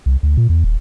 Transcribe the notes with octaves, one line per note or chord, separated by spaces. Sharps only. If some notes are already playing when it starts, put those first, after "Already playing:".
C2
D2
A#2
E2
D#1